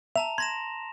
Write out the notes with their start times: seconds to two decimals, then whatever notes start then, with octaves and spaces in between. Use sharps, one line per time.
0.16 E5 A5 A#5 F7
0.38 C6 G#6 A#6 E7